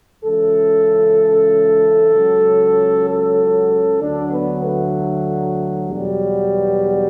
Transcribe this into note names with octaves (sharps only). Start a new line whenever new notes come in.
C#2 C#3 E3 A4
C#2 C#3 F#3
A4
D2 D3 F#3 D4
B3
A3
E2 B2 F#3 G3